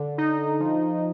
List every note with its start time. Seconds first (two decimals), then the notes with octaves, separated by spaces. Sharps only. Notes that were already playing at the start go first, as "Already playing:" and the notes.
Already playing: D3
0.18 D#4
0.60 F3